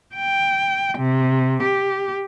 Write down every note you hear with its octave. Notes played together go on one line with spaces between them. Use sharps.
G5
C3
G4